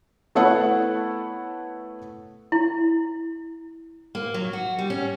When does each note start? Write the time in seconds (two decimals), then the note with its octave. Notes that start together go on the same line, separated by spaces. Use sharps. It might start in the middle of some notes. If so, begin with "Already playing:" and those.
0.35 A3 B3 E4 A4 C#5 F#5
2.52 E4
4.15 A#3
4.34 F#3
4.53 F#4
4.78 G3
4.90 C#4